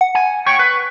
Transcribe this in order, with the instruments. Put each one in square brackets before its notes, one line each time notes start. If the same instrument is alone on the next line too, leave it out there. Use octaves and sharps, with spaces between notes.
[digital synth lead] F#5
[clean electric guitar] G#5
[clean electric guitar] C#5 G5 [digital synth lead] C#6
[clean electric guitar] B4